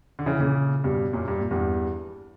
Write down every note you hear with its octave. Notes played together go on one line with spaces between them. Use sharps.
D3
C#3 E3
A#2 C#3
G2 B2
F#2 A#2
G2
A#2
E2 G2